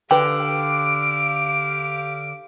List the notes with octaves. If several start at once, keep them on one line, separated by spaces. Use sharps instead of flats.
D3 G4 B4 F5 G5 D6 D7